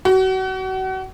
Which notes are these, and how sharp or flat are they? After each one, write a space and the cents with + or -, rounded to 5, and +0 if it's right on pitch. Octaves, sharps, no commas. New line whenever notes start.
F#4 +35